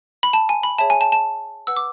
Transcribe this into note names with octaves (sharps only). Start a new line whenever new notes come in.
B5
A5
G#5
B5
G#4 C#5 E5 A5
G#5
A5
A5
B4 F#5 E6
D6